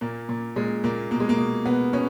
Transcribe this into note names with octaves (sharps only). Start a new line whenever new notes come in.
A#2 A#3
A#2
A#2 G#3
A#2 A#3
B2 A#3
G#3
A#3
B2
B2 B3
B2 C#4